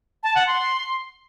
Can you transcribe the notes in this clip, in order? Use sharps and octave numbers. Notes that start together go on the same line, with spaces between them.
A5
F#5
C6